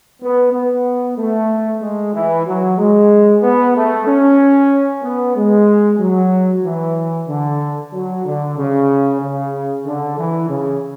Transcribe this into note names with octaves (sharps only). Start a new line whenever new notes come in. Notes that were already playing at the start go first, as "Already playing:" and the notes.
B3
B3
A3
G#3
E3
F#3
G#3
B3
A3
C#4
B3
G#3
F#3
E3
D3
F#3
D3
C#3
C#3
D3
E3
C#3